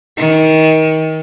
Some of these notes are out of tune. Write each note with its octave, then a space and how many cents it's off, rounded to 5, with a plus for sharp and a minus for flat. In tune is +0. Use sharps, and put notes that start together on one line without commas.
D#3 +25